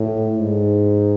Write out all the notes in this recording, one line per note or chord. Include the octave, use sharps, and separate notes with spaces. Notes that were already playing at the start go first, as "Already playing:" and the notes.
Already playing: A2
G#2